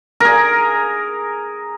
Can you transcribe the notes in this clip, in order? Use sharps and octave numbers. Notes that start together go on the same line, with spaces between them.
G#4 A#4